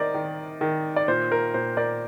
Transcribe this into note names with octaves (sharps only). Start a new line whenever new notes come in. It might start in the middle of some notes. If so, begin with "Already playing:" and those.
Already playing: D#3 A#4 C5 D5 D#5
D#3
D#3
D5
A#2 C5
A#4
A#2 C5
A#4 D5